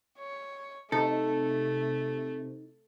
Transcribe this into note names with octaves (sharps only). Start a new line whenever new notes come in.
C#5
C3 A3 D#4 A4